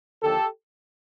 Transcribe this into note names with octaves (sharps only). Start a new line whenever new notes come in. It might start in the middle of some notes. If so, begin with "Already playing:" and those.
D#2 D3 F3 A#3 G4 A4